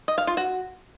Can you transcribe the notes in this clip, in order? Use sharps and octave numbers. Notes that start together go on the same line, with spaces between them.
D#5
F5
F4
F#4